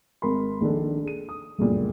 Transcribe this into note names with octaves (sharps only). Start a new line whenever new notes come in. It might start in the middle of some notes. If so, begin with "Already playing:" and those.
G#1 A#4 B5 C6
A#1 D#3 D4 A4
G#4 D#7
D#6
G1 C#2 F#2 A#2 C#3